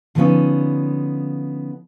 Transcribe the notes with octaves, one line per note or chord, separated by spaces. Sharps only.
D3 F3 A3 B3 C#4 D#4